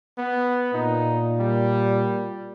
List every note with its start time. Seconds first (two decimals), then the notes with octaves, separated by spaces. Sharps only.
0.18 B3
0.74 A#2 D#4
1.40 G3